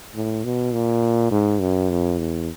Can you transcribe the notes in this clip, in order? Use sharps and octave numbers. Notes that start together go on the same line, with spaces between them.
A2
B2
A#2
G#2
F#2
F2
E2